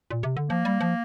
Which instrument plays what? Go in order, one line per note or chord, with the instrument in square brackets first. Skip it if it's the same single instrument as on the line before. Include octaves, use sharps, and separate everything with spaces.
[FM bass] A#2
C3
D3
[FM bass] F3 [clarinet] A#3
[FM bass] G3
F3